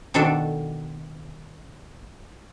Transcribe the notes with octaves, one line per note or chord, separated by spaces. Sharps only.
B2 D#3 D4 F#4 A4 D5